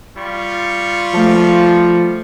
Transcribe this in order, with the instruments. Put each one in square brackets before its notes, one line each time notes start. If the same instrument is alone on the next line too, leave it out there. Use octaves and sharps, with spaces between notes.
[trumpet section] G3 F4 C#6
[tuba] F3 [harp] A3 A5